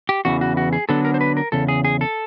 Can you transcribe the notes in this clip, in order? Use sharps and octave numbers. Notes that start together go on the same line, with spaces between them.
G4
E2 C#3 E3 F#4
F#4
F#4
G#4
D3 F#3 B3 D4 A4
A#4
C5
B4
A#4
E2 C#3 A4
G#4
G#4
A4